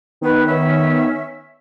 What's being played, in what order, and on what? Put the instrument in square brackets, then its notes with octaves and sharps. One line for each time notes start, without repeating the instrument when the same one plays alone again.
[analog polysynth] D#3 B3 [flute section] B4
[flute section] C#4 E5